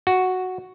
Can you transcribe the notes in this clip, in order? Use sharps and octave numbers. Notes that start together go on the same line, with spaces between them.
F#4